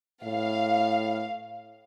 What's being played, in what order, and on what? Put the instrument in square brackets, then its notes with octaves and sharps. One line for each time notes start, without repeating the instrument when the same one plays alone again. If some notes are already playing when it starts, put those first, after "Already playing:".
[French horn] A2 [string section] F5